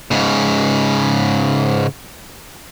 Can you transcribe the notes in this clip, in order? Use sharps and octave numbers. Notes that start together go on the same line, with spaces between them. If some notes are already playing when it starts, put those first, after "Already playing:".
G#2 C#3